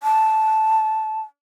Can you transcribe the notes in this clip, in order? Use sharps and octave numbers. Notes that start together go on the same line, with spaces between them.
A5